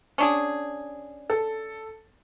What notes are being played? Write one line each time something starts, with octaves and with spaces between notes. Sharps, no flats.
C#4 D4 G#4
A4